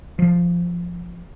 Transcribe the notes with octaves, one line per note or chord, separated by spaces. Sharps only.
F3